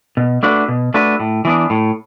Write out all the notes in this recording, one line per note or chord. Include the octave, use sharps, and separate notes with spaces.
B2
A3 D4 F#4 B4
B2
A3 D4 F#4 B4
A2
E3 B3 D4
A2